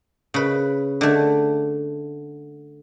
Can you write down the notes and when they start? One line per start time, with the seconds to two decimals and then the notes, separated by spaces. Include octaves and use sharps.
0.34 C#3 B4
1.01 D3 A3